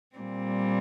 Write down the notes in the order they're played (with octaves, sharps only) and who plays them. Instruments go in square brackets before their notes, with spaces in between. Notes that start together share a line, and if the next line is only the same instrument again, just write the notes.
[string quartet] A#2 G3 C4